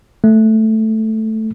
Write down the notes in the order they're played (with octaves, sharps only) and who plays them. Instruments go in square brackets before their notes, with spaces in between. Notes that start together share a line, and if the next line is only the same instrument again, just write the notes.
[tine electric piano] A3